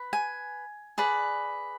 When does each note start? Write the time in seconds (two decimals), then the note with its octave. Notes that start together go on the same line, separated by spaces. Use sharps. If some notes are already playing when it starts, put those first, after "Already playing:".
Already playing: B4
0.13 G#5
0.98 G#4 B4 D5